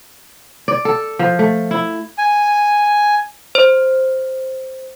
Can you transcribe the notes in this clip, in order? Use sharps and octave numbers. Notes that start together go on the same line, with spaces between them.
D5
A4
F3
A3
E4
G#5
C5